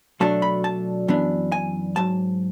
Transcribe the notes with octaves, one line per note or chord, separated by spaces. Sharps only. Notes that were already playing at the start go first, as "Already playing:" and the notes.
B2 F#3 A3 D4 A5
B5
A5
F#2 E3 B3 D4
G#5
G#2 F#3 A5